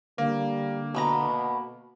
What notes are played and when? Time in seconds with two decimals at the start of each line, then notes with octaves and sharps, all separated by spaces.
0.18 D3 G3 A#3
0.94 B2 A3 B3 A#5